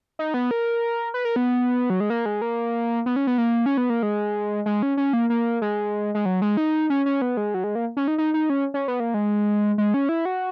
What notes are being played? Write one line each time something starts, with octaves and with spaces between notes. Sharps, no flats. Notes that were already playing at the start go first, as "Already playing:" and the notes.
D#4
B3
A#4
B4
A#4
B3
F#3
G#3
A#3
G#3
A#3
B3
C#4
B3
A#3
C#4
B3
A#3
G#3
G#3
C#4
C#4
A#3
A#3
G#3
G#3
F#3
G#3
D#4
C#4
C#4
B3
G#3
F#3
G#3
A#3
C#4
D#4
D#4
D#4
C#4
C#4
B3
A#3
G#3
G#3
C#4
E4
F#4